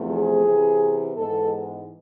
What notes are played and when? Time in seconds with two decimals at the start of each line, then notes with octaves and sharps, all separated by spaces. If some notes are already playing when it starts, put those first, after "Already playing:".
Already playing: E2 C3 F3 A3 C4
0.09 G#4
0.45 C3 E3 B3
1.16 G#2 E3 G#3 B3 A4